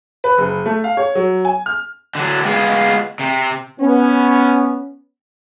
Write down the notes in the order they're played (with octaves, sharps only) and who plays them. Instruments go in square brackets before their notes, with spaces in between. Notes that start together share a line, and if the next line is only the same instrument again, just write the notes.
[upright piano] B4
F#1
A3
F5
C#5
F#3
G#5
F6
[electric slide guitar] D3 F#3
G#3 B3 F4
C3
[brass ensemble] B3 C#4